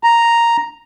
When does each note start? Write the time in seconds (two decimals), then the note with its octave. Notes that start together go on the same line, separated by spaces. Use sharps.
0.03 A#5